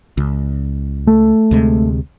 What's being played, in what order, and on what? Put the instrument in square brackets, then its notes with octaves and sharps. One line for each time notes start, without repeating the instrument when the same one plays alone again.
[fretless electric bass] C#2
[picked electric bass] A3
[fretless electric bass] D2 C3 G#3